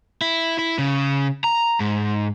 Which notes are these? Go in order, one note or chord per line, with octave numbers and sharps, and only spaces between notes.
E4
E4
C#3
A#5
G#2